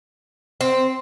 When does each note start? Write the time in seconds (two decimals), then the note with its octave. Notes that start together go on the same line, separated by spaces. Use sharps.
0.61 C4